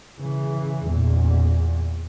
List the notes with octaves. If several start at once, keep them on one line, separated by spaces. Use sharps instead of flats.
C#3 E3
E2 A#2